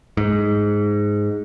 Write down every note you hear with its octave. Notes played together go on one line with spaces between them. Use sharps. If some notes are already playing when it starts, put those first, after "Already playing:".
G#2